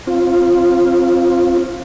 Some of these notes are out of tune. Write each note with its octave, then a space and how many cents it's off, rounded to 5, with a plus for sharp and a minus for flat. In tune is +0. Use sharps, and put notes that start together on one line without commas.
C4 +25 F4 +0